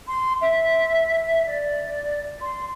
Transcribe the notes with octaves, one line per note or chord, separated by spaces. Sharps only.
C6
E5
D5
C6